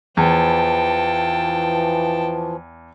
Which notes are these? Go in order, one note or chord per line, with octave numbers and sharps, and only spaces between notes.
E2 E3 F3 G5 A5